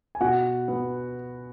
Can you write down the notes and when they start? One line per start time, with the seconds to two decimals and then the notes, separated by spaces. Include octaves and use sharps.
0.15 G#5
0.20 B2 F#4 F#5
0.68 B3